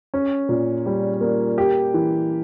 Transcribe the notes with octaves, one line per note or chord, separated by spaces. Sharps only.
C#4
A#2
G3
A#3
G4
E3